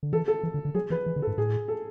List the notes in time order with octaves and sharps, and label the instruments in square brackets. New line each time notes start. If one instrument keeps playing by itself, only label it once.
[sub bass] D3
[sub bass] E3 [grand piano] A4
[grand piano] A4
[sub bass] E3
D3
D3
[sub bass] F#3 [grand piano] G#4
[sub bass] E3 [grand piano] B4
[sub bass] E3
D3
[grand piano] A4
[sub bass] G#2
[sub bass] A2 [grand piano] G#4
[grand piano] A4